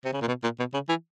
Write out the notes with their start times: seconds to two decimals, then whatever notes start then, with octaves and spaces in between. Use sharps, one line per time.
0.05 C3
0.14 C#3
0.22 A#2
0.28 B2
0.44 A#2
0.59 B2
0.74 C#3
0.89 E3